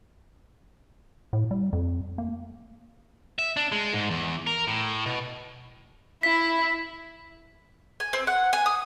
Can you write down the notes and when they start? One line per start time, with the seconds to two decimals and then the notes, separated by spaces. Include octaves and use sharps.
1.33 A2
1.51 G3
1.73 F2
2.18 A#3
3.39 E5
3.57 D4
3.72 G#3
3.93 G#2
4.10 E2
4.47 A#4
4.68 A2
5.06 B2
6.23 E4 B6
8.00 G#5
8.13 C4
8.27 F#5
8.53 G#5
8.66 D#6